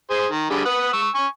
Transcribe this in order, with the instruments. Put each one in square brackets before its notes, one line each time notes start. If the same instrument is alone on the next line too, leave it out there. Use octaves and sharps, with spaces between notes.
[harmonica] G#4 C5
D#3
D3 G3 G#4
B4 F#5 D#6
C#6 E6
G#5 C#6